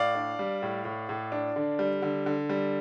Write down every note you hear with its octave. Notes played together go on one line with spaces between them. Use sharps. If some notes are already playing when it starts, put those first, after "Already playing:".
Already playing: A2 D5 F5
D4
G3
A2
A2
A2
D4
D3
G3
D3
D3
G3